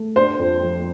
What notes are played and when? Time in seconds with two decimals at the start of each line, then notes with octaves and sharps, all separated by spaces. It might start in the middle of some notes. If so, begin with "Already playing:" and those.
Already playing: A3
0.16 D4 C5
0.39 F2
0.63 F3